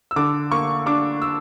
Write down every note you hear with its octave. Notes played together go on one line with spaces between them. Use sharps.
E6
D3 D6
A#3 C#6
D4 D6
E6